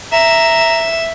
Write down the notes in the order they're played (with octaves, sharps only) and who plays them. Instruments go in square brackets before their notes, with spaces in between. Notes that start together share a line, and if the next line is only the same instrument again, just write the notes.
[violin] E5 E7 [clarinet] A#5